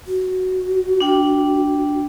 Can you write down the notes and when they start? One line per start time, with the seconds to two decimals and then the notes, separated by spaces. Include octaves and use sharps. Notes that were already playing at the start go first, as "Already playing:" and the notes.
0.07 F#4
1.00 D4 G5